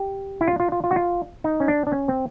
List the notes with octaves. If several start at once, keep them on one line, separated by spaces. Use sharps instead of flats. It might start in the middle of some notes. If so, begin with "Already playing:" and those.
Already playing: G4
E4
F4
F4
F4
F4
F#4
F4
D#4
C#4
D4
D4
C#4
C4